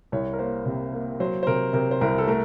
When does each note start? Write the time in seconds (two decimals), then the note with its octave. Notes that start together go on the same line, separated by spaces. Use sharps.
0.12 C2 C#5
0.33 A#4
0.39 A#3 C5
0.66 C3
0.93 A#3
1.20 F#3 C5
1.43 C5
1.47 C3 A#4
1.73 C3 A#4
1.91 C5
2.01 C2 A#4
2.18 A4
2.27 A3 A#4